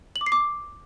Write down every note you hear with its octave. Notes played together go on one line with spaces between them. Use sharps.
F#7
D6
C7
D6